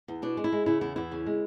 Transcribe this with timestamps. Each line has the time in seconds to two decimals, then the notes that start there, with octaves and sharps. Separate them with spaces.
0.08 E2
0.22 B2 D4
0.37 G#3
0.44 E4
0.52 G#3
0.66 C#3 E4
0.81 E2 E4
0.96 E2 E4
1.11 C#3
1.26 G#3